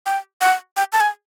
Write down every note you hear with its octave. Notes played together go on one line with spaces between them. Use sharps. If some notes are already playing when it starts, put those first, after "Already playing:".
G5
F#5
G5
A5
G#5